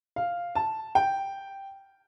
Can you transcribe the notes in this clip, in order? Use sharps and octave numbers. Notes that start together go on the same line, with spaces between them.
F5
A5
G5